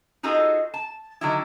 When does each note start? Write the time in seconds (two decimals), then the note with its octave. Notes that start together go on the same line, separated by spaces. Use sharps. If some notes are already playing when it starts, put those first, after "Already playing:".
0.23 D#4 F4 F#4 G#4 A4 D#5
0.74 A5
1.21 D3 D#3 F#3 D4 E4